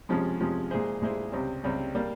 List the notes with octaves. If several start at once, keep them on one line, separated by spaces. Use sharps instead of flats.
F2 C3 F3 G#3 C#4
F2 C3 F3 G#3 C#4
A#2 G#3 E4 G#4 C5
A#2 G#3 E4 G#4 C5
C#2 C3 G3 C4
C#2 C3 G3 C4
G3 A#3